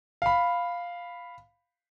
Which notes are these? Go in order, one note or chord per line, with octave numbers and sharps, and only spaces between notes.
F5 B5